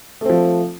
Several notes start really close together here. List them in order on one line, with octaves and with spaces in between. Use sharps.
A3 C4 F3